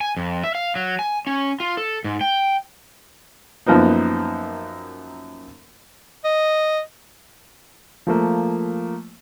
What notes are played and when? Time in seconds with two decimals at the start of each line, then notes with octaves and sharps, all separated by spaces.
0.01 G#5
0.17 F2
0.44 E5
0.55 F5
0.76 F#3
0.99 G#5
1.27 C#4
1.60 F4
1.77 A4
2.04 G#2
2.21 G5
3.66 F#2 F3 A#3 B3 D#4
6.24 D#5
8.07 F3 A3 A#3